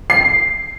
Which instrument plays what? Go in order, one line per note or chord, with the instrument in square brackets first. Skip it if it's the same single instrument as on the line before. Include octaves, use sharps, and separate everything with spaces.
[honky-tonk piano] C7